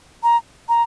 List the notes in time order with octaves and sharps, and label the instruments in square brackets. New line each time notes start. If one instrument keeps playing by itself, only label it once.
[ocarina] A#5
A#5